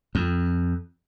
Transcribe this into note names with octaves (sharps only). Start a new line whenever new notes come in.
F2